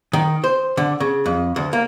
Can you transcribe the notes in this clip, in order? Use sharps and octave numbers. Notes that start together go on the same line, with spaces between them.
D#3
C5
D3
C#3
F2
D2
A#3